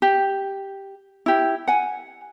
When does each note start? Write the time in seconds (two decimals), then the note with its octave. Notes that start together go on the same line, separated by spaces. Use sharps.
0.02 G4
1.26 E4 G4
1.68 F#5 G#5